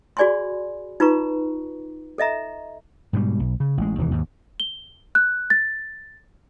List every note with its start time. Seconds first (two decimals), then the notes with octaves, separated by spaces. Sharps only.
0.17 F#4 G#4 D5 G#5 B5 C6
1.00 D#4 F4 B4 A#5 C#6
2.18 A4 D#5 E5 A#5
3.13 G#2 B2 E3 G3
3.39 B1
3.60 C#3
3.77 A1 G#3
3.98 E1 D#2 E3
4.11 D#2 G#2
4.60 G7
5.15 F#6
5.50 A6